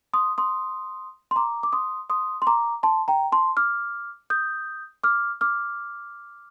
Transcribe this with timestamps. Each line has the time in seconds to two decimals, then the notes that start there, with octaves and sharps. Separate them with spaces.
0.13 C6 D#6
0.38 C6 D#6
1.31 C6
1.36 A#5 D6
1.63 D6
1.73 C6 D#6
2.10 C6 D#6
2.42 C6
2.47 A#5 D6
2.83 A5 C6
3.08 G5 A#5
3.32 A5 C6
3.57 D6 F6
4.30 D#6 G6
5.03 D6 F6
5.41 D6 F6